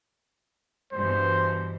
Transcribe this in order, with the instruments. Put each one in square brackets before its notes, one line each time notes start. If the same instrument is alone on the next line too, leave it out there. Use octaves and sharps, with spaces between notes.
[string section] G2 B2 E3 [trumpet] C5